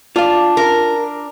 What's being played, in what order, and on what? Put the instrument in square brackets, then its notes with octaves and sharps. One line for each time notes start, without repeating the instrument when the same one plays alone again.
[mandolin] D4 [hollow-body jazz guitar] F4 F5
[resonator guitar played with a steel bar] A#4